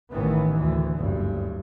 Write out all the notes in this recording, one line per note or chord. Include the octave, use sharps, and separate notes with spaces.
A1 D#3 E3 B3
D2 E3
F#1 D2 G2